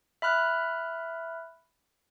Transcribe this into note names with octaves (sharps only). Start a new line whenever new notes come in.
E5 B5 F6 F#6